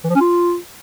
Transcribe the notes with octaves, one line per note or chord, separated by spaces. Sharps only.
E3
F3
C#4
F4